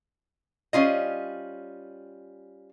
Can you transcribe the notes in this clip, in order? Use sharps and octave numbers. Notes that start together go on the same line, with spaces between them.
G3 C#4 F4 D#5